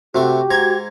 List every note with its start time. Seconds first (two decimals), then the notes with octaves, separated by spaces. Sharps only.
0.15 C3 A3 F#4 G4 C#6
0.50 G#2 A#5 C#6 G#6